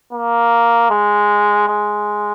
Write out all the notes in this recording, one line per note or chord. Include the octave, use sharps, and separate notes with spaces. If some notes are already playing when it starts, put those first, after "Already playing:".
A#3
G#3
G#3